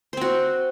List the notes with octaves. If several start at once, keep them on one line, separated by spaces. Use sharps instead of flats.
C4 F#4 C5